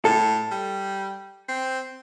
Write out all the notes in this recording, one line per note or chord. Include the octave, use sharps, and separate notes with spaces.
A2 A4
G3
C4